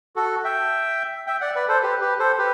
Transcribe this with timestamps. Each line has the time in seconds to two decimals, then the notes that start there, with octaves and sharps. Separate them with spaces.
0.16 F#4 A4
0.44 E5 G5
1.27 E5 G5
1.41 D5 F#5
1.55 B4 D5
1.68 A4 C5
1.82 G4 B4
2.01 G4 B4
2.19 A4 C5
2.38 G4 B4